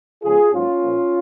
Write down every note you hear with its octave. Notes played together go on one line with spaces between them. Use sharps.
C#3 F3 G#3 B3 F4 G#4
G#2 F#3 A#3 C#4 F4
A#2 F3 A#3